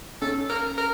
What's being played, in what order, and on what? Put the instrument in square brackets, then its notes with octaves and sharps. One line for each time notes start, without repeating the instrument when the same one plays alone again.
[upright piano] C#4 [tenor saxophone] A4
[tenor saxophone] A#4
A#4